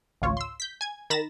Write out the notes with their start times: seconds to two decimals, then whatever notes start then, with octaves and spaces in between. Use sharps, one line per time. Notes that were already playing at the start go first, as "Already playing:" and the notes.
0.22 A1 D2 F4 C#5
0.37 C6 E6
0.60 G6 B6
0.81 G#5 G#6
1.10 D#3 A#5 B5 A6 A#6 E7